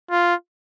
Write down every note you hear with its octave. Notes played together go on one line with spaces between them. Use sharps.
F4